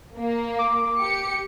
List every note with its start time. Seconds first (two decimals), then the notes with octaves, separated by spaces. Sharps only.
0.19 A#3
0.59 D6
1.00 G4 C#7